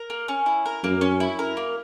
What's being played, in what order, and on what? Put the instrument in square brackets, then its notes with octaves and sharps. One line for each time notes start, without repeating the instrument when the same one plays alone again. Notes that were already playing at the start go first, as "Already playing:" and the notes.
Already playing: [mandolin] A#4
A#3
C#4
E4
A#4
[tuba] F#2 [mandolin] A#3
[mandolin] C#4
E4
A#4
A#3